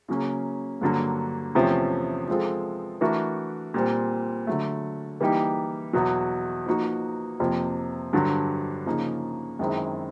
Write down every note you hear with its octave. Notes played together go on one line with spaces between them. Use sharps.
C#3 F#3 A#3 C#4
G2 D3 F#3 A#3
E2 C3 F3 A3 C#4
F3 G#3 C4 F4 A4
E3 A3 D4 F#4 A#4
A#2 G3 C4
D3 F#3 A3
E3 G3 A#3 D#4 G4
E2 B2 F#3
F3 A#3 D#4 F#4
F2 C3 F3 A#3
G2 D3 F#3
C#3 F3 A#3 D#4
F#2 D#3 G#3 C4 E4